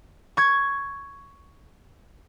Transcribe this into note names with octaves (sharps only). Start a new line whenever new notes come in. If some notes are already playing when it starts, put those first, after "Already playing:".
C#6 G#6